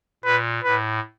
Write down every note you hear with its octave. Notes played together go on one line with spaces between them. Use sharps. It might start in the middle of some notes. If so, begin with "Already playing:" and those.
A#2 B4
A2 B4